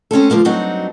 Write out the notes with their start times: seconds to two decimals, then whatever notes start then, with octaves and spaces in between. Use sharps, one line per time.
0.11 C4 C#4 F4 A4
0.30 D2 F3 A#3 C4
0.45 G2 F#3 C4 D4 D#4 F#4